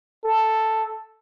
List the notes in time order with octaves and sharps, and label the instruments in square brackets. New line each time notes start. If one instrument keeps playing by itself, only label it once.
[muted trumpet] A4